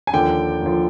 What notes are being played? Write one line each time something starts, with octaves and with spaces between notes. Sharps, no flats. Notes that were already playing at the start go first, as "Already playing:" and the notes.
G#5
D#2 D3 F3 G5
D#2 D3 F3